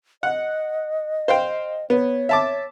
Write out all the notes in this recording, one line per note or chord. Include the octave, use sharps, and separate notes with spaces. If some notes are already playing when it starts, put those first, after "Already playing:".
D#5 F#5
C5 F5 G5
B3 C#5
E5 A5 D6